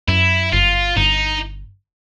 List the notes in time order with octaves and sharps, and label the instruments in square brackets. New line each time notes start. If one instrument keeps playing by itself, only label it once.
[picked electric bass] F#2 [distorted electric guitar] E4
[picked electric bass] G1 [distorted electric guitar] F4
[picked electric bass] G1 [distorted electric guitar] D#4